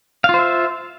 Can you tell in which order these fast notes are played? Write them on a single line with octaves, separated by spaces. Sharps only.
F5 F4 C5 E5